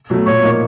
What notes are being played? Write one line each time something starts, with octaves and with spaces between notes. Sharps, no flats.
B2 F#3 A3
A#2 C#5
F3 A#3 D#4